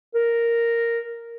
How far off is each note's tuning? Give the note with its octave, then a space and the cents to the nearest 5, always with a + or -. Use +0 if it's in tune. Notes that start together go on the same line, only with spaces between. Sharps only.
A#4 -5